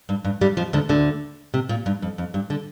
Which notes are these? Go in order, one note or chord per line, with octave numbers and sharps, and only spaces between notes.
G2
G2
G2 G3
F2 F3
D2 D3
D2 D3
C3
A#2
G2
F2
F2
G2
D3